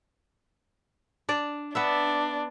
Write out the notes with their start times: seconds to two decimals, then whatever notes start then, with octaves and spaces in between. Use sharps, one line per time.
1.29 D4 D5
1.75 B3 D4 B4 E5